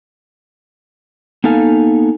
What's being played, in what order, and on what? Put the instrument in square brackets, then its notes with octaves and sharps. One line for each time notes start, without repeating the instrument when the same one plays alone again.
[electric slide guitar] A#3 B3 D#4 A4 F5 G#5